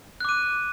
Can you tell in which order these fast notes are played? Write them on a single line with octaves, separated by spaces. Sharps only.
F#6 D6 D#7